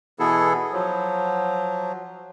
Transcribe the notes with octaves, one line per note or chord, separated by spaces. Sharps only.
B2 E3 B3 E4 G#4 A4
F3 F#3